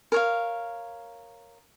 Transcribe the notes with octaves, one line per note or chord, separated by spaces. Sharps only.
A#4 C#5 F5